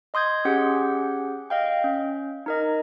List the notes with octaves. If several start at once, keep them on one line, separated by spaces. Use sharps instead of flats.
D#5 C6 D#6 G6 G#6
C#4 G4 G#4 F#5
D#5 F5 G5
C#4
D#4 A#4 D#5